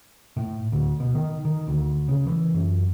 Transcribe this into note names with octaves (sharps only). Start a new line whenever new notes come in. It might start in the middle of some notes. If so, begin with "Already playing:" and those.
A2
D2
B2
D#3
D#3
D2
C#3
E3
F#2